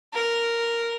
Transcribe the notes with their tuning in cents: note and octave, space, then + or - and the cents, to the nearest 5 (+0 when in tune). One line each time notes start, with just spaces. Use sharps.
A#4 -5